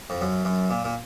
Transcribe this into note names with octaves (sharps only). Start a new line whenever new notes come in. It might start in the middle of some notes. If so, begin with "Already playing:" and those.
F2
F#2
F#2
A#2
A#2